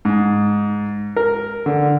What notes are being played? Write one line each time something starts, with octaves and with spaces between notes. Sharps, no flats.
G#2
A#4
D3